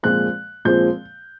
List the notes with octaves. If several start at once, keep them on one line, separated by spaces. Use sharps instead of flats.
A#2 F3 G#3 C4 F#6
A#2 F3 G#3 C4 G6